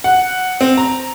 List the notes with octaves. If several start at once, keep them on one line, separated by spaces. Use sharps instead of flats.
F#5
C4
A#5